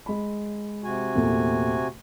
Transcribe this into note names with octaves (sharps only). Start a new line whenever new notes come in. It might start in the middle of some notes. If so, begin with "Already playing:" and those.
G#3 B5
C3 F#4 G#5
E2 A#2 A3